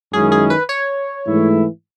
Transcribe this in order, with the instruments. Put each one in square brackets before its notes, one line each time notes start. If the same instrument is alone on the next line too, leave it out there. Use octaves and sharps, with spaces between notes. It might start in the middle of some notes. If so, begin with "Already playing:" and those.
[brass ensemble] F#2 D#3 G#3 C#4 E4 [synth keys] G#4
[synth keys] G#4
B4
C#5
[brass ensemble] G#2 E3 A3 E4